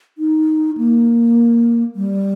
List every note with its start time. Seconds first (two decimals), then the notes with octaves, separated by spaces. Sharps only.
0.18 D#4
0.77 A#3
1.95 G3